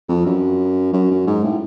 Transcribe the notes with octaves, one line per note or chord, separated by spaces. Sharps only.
F2
F#2
F#2
F#2
G#2
A2